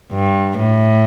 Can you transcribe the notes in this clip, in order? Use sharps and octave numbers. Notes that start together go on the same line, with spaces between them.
G2
A2